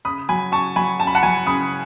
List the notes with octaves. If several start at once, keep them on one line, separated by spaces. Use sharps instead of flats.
C#3 B5 D#6
F#3 G#5 B5
C#3 A5 C#6
F#3 G#5 B5
C#3 A5
B5
F#5 A5
F#3 G#5 B5
C#3 B5 D#6